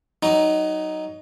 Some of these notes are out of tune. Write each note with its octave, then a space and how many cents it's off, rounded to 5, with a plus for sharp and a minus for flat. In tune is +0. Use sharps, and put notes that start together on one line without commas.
F#3 +25 D#4 +0